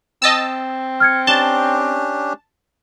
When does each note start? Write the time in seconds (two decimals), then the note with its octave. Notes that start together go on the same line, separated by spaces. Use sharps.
0.22 C4 D#5 A5 E6
1.00 F6 G#6 C#7
1.27 C#4 D4 G4 A5 G7